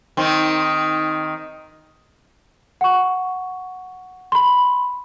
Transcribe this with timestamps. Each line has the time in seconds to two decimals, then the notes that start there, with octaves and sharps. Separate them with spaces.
0.17 D#3 C4
2.81 F#5 C#6
4.32 B5 C6